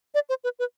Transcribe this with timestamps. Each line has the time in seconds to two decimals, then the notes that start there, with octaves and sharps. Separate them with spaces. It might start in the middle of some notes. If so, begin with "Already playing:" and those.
0.14 D5
0.29 C5
0.44 B4
0.59 B4